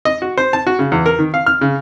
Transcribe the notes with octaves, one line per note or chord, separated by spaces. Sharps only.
D#5
F#4
C5
A5
F#4
C#3
E2
A#4
D#3
F5
F6
C#3